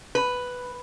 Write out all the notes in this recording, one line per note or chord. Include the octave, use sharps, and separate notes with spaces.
B4